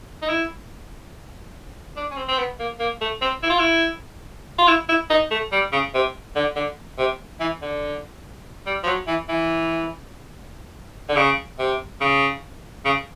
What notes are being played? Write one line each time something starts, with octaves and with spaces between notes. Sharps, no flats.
D#4
E4
D4
C#4
C4
C4
B3
A#3
A#3
A3
C4
E4
F4
E4
F4
E4
E4
D#4
A3
G3
C#3
C3
D3
D3
C3
E3
D3
G3
F3
F#3
E3
E3
D3
C#3
C3
C#3
C#3